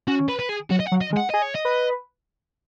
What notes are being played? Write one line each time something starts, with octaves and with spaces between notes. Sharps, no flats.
C#4 F#4
B4
B4
G#4
F#3 F#4
D#5
F#5
F#3
D#5
G#3
F#5
G#4 D#5
C#5
D#5
B4